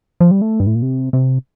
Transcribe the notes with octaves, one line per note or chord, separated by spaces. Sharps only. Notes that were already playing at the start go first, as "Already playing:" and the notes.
F3
G3
A3
G2
A2
A#2
C3
C3